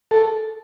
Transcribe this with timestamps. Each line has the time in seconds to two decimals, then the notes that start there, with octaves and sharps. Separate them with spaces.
0.11 A4